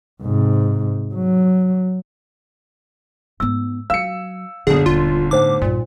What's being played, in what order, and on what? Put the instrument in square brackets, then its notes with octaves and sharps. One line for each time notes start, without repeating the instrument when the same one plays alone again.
[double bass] G#2 C3
F#3
[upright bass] G#2 B3 [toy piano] E6
[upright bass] F#3 [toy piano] F5 [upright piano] E6 C#7
[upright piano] G1 D3 [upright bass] F#2 A#2 [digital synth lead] G#4
[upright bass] D#1 [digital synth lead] F4
[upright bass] A2 [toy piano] D#4 C5 F#5 [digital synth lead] D6
[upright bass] A#1 G2 [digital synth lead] A#2